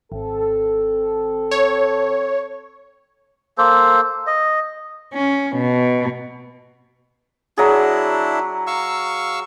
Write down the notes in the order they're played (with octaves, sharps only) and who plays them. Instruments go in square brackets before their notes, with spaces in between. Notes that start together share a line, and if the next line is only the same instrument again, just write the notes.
[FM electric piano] G#1 [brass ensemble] C4 A4
[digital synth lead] C#5
[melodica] A#3 A4 C5
D#5
[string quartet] C#4
B2
[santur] F#3 G#4 [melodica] D4 E4
[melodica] F5 C#6 E6